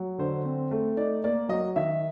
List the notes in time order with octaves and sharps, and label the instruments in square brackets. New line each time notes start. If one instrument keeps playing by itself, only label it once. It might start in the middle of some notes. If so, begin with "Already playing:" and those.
Already playing: [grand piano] F#3
[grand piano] D3 [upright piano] C5
[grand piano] C4
A3
[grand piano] D#4 [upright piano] D5
[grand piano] A#3 [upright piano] D5
[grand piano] F#3 [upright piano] D#5
[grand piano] D#3 [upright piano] E5